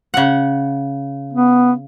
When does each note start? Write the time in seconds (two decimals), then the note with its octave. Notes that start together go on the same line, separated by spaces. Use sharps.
0.14 C#3 F#5
1.33 B3